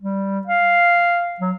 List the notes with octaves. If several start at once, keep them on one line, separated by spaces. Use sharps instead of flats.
G3
F5
F#3